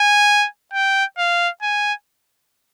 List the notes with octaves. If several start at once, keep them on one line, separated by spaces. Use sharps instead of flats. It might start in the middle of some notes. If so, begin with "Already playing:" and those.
Already playing: G#5
G5
F5
G#5